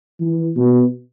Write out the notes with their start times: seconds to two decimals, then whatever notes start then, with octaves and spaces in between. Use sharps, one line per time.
0.20 E3
0.56 B2